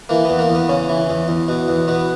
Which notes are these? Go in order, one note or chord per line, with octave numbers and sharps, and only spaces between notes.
E3 A#3
E2 B3
A#3
E2
B3
C#3 C#4
E3
E2
E2
B2
E2
B2 B3